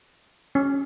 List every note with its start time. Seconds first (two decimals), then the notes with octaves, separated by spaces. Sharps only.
0.55 C#4